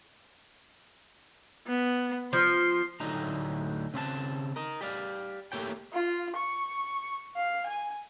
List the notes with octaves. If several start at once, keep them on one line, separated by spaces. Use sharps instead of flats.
B3
F3 C6
D2 A2 D3 F#3 D#4 A#5
C#3 C4 E5 A5
A#4 D#5
G4 D5 F5
A3 A#3 G4 C#5 G5
F4
C#6
F5
G#5